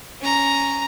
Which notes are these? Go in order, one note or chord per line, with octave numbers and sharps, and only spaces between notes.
C#4 A#5